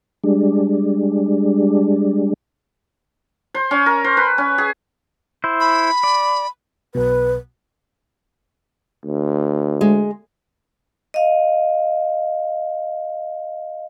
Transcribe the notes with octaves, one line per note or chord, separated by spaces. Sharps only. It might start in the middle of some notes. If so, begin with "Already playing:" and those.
G3 G#3 D4
C5
C#4
A#4
C5
B4
C#4
G#4
E4 C5
B5
D5
B1 B2 B4
D2
G#3
D#5 F5